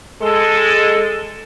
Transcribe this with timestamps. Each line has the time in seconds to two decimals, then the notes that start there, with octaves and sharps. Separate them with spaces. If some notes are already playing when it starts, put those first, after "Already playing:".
0.21 G#3 A4